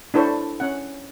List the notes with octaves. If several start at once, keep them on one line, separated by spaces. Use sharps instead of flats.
D4 E4 A4 C5 C#5
C#4 F#5